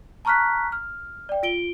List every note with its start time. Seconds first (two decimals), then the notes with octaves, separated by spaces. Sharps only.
0.25 A5 A#5 C#6 F6 F#6 B6
0.72 F6
1.29 D5 G5
1.43 F4 D7 G7